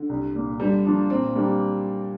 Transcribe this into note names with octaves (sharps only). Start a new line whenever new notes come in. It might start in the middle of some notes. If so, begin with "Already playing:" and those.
Already playing: D3
C2
A#2 A#3
D3 G3
F3 A#3 D4
A#2 C4
G3 A#3 D4